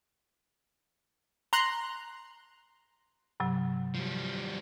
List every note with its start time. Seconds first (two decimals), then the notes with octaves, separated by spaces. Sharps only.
1.53 A#5 C6 F#6
3.40 G2 C3 F#3
3.95 F3 G3